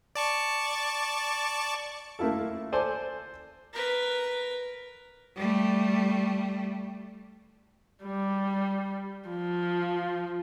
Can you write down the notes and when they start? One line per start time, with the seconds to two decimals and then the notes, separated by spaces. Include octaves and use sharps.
0.15 D5 A5 C#6
2.19 A3 A#3 E4 F4 A4
2.72 A4 C5 D5 G#5
3.73 A#4 B4
5.36 G3 A3
8.05 G3
9.29 F3